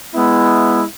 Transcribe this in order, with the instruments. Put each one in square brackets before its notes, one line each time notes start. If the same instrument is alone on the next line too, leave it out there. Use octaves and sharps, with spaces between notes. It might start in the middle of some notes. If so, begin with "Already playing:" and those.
[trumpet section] G#3 B3 E4